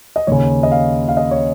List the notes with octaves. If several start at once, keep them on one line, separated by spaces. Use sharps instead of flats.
D#5
D#2 C#3 C#5
D#5
F5
F5
D#5
C#5